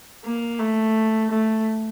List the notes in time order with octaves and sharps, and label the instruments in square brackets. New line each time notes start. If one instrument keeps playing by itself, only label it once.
[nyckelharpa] A#3
A3
A3